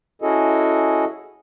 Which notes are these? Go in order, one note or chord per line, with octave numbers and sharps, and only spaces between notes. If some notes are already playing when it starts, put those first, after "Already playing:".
C#4 E4 F#4 G#4 A4 D#5